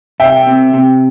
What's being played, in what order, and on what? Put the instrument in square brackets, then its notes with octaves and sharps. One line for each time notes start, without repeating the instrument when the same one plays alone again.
[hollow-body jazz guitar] C2 [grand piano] E5 G5
[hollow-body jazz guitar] C3
C3